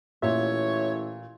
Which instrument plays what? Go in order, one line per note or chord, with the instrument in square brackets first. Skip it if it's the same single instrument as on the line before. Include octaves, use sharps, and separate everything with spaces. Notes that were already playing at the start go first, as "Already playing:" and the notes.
[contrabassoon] A1 [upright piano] A#2 [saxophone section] C#5 [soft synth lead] E5